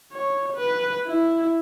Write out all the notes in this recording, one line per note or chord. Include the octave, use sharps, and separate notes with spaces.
C#5
B4
E4